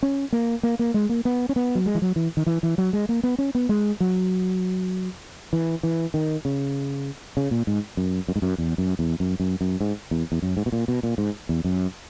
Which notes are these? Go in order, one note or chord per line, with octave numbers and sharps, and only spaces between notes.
C#4
A#3
A#3
A#3
G#3
A#3
B3
C#4
B3
F#3
G#3
E3
F#3
E3
D#3
E3
E3
F#3
G#3
A#3
B3
C#4
B3
G#3
F#3
E3
E3
D#3
C#3
C#3
A#2
G#2
F#2
F#2
G#2
F#2
E2
F#2
E2
F#2
F#2
F#2
G#2
E2
E2
F#2
G#2
B2
A#2
B2
A#2
G#2
E2
F#2